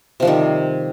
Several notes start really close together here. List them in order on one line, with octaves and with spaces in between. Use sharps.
C3 F3 G3 D#3